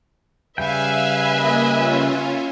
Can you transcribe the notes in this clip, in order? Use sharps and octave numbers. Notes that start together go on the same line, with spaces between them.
C#3 G3 B4 E5 F5 G5 G#5
A#3 D#5
C#4 F4